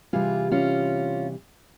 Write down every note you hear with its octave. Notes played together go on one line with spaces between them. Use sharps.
C3 E3 G3 F4 G#4
C#4 F4